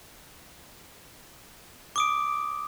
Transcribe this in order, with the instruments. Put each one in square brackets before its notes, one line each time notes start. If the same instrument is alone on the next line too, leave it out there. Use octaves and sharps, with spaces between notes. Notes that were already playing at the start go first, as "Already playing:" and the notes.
[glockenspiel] D6 D#6 D7